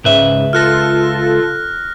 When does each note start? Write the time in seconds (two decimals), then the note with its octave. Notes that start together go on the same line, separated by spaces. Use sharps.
0.04 C#2 G#2 C#3 B4 E5
0.53 F4 A4 F6 F#6 A#6